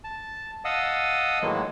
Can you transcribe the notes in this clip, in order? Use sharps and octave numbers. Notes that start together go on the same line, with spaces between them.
A5
D#5 F5 F#5 A5 D#6 E6
A2 D#3 E3 F#3 G#3 A#3